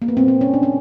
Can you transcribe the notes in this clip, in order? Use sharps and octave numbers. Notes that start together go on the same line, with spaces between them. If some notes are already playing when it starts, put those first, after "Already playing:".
A#3
B3
A#2 G3 A#3 C4
C4
C#4
D4
C#4